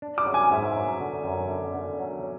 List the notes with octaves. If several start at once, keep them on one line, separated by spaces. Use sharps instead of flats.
D4
D6
F#3
G#5
G#2 E5
F#3
D3
F#2
D3
D3
F#3
F#3